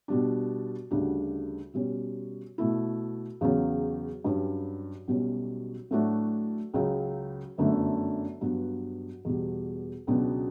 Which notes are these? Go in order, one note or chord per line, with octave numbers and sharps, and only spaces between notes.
B2 G3 D4
D2 C#3 G3 D4 F#4
B2 G3 C#4
B2 A3 E4
E2 C#3 F#3 C#4
G2 F#3 C#4 G4
B1 B2 G3 C#4
A2 F#3 A3 D4 F#4
C#2 C#3 F#3 C#4
G1 F#2 D3 A3
G2 F#3 B3 F#4
E2 B2 G3
C#2 B2 F#3 B3 D4